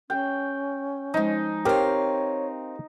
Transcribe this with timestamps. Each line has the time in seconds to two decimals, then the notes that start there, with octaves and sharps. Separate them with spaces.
0.10 C#4 G5
1.14 F3 G#3 D#4
1.65 C4 G4 A#4 C#5 F5